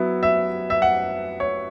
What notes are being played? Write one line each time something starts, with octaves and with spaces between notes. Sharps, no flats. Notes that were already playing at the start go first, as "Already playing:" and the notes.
Already playing: F#3 B3 E4
E5
E5
F#5
C#5